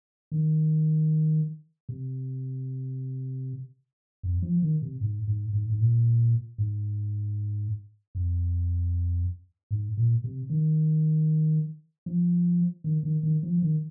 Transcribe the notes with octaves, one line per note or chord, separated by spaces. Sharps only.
D#3
C3
F2
F3
D#3
C3
G#2
G#2
G#2
G#2
A#2
G#2
F2
G#2
A#2
C3
D#3
F3
D#3
D#3
D#3
F3
D#3